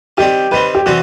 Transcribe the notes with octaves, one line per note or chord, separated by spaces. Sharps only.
D#3 G3 C4 G4
D#3 G3 C4 B4
G4
C3 E3 G3 C4 F#4